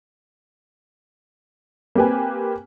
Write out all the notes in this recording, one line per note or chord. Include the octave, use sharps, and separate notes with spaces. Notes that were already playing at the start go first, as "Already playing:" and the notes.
A#3 C4 G4 B4 G#5